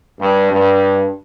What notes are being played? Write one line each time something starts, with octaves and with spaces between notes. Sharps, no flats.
G2
G2